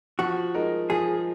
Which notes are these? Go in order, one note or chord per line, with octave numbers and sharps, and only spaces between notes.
F3 F#4
G#3 D#4 A#4
F3 G#4